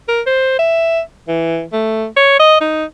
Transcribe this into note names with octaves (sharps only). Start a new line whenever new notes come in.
A#4
C5
E5
E3
A3
C#5
D#5
D#4